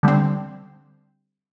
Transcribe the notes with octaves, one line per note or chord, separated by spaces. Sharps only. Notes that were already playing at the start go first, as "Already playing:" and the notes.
D3 G3 C4